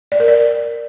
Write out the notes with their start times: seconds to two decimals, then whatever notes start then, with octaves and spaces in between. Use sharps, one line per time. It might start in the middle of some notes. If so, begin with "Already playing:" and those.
0.12 D5
0.20 A#4
0.28 D5